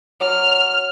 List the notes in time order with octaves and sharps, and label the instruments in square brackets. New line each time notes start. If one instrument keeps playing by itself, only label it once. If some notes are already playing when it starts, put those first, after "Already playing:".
[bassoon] F#3 [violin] F6